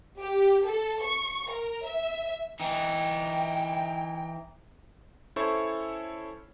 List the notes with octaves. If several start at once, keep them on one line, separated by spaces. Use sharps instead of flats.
G4
A4
C#6
A#4
E5
E3 D#4 G5
C#4 E4 A4 C5 C#5 C#6